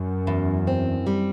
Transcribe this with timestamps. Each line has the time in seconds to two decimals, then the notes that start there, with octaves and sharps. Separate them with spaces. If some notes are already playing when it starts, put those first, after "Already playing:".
Already playing: F#2
0.27 E2
0.67 C4
1.07 G3